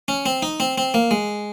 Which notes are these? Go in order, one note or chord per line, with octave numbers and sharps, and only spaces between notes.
C#4
C4
D#4
C4
C4
A#3
G#3